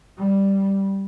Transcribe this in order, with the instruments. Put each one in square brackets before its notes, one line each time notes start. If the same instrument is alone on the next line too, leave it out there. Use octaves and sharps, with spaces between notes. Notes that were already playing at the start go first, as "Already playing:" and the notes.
[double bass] G3